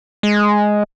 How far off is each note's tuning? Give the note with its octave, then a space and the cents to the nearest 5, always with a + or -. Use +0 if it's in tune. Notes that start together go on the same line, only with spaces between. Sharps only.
G#3 +5